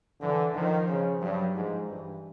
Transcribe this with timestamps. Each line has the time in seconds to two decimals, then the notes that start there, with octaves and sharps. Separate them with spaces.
0.20 D3 E3
0.54 D#3 F3
0.87 C#3
1.21 G2 F#3
1.54 G#2 F3
1.88 G2 E3